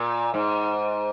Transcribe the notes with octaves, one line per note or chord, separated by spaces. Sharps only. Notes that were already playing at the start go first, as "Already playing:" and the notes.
Already playing: A#2
G#2